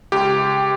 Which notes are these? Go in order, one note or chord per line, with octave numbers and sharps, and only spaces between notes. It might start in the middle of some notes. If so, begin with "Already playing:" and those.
C#2 G4